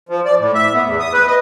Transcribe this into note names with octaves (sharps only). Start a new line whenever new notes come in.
F3
D5
A2
E5
B3
E2
D#6
B4
D#5